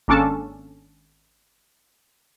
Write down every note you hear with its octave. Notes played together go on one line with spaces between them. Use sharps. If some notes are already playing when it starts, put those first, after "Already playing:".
G#1 A#3 C#4 D4 A4 A5